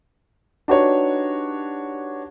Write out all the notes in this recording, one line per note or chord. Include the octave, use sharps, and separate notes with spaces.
D4 D#4 F#4 G4 B4 C#5